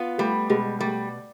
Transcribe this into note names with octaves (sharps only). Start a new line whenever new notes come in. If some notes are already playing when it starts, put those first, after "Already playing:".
Already playing: B3 F4
G3 A3
B2 G#3
G3 A3